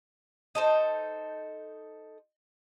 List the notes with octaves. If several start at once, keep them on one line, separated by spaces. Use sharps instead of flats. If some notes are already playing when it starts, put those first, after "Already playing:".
D#4 A4 C5